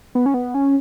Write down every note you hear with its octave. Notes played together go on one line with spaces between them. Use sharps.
B3
C#4
B3
C#4